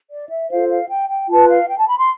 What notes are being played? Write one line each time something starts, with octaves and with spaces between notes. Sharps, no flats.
D5
E5
F4 A4 C5 F5
F5
G5
G5
F4 B4 A5
F5
G5
A5
B5
C6